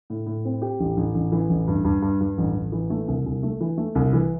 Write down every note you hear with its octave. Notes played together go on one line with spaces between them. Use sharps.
A2
A2
C4
G4
A1
A1
A1
E3
A1
G2
G2
G2
G2
A1
A1
E3
A3
C2
C2
A3
E3
A3
C2
E3